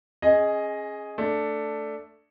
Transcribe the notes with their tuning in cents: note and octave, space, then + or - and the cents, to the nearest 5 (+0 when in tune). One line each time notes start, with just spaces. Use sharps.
C#4 -25 G#4 +5 D#5 +5
A3 +5 D4 +0